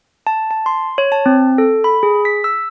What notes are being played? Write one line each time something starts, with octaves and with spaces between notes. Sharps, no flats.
A5
A5
C6
C#5
A5
C4
A4
B5
G#4
B6
E6